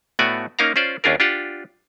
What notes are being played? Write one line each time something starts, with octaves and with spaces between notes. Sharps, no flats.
A2 A3 B3 F#4 D5 G#5
A#3 C#4 D#4 A#4 F5 A#5
C#4 F4 C5 D5
D#2 C#4 D4 F4 G#4 A#4
D4 F4 G4 F#5